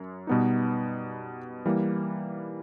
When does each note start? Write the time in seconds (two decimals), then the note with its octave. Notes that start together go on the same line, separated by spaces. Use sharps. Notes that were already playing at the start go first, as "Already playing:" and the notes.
Already playing: F#2
0.27 B2 G3 B3 D#4
1.65 E3 G3 A#3